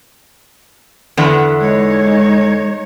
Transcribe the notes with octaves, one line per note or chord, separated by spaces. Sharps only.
E2 D3 B3
G#3 D#4 C#5